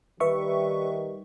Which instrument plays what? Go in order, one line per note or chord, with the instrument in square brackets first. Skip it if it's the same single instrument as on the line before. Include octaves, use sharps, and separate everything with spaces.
[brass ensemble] D#3 G3 [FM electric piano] B4 E5 C#6